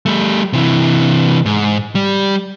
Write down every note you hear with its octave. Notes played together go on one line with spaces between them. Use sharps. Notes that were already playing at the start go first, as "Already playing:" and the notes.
G3 A3
C3 E3
G#2
G3